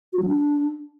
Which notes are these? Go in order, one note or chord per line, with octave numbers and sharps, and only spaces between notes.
F#4
F#3
D4